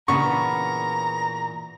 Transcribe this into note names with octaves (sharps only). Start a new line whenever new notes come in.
A#2 C#3 E3 B3 D4 A#5 C#6